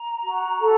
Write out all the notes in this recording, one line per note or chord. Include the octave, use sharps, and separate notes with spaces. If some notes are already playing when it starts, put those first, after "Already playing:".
Already playing: A#5
F#4
A4